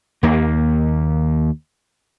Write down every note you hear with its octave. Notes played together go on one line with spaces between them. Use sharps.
D#2 A#3